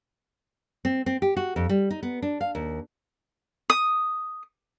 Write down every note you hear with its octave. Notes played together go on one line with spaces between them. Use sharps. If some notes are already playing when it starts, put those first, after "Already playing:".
C4
C4
G4
F#4
F2
G3
D#4
B3
D4
F5
D#2
D#6